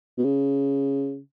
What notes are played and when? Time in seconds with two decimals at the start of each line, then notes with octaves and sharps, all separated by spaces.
0.18 B2
0.24 C#3